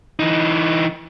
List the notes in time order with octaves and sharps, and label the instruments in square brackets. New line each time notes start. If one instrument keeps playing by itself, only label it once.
[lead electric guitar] E3 D#4